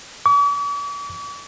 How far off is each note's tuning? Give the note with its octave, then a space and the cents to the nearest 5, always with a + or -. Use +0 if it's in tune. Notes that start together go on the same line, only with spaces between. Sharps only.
D6 -45